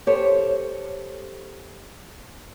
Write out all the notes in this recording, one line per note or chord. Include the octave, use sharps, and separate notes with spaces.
G4 A4 C5 C#5